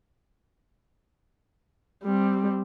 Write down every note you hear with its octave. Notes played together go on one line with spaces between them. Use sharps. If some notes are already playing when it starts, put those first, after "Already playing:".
G3 C4